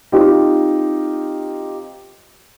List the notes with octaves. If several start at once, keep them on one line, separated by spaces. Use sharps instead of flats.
C4 D#4 F4 G4